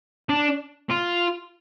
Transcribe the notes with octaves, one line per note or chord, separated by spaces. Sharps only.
D4
F4